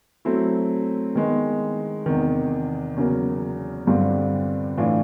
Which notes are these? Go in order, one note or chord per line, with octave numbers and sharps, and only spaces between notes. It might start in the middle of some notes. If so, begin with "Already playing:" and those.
F#3 A3 C4 E4
D#3 G#3 B3
E2 C3 D#3
E2 C#3 F#3 A#3
G2 D3 G3 C4 F4
A2 E3 A3 D4 F4